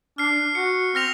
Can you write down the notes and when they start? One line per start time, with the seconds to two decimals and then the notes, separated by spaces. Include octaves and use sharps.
0.18 D4 F6 C7
0.55 F#4 C#7
0.95 C4 F6 A#6 F7